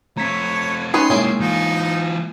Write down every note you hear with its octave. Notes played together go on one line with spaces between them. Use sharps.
A3 C4 C#5 A#5 B6
C#4 D#4 G#4 B4 C#5 C6 D#7
B1 G#3 A#3 C#4 E4 G#4 G#5
E3 D#4 F4